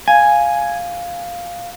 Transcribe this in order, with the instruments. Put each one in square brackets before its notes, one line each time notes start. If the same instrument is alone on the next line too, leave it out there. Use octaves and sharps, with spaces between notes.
[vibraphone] F5 [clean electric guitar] G#5